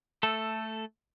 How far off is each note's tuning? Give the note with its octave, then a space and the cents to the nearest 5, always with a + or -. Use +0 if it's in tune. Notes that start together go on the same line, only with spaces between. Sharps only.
A3 +5 A4 +0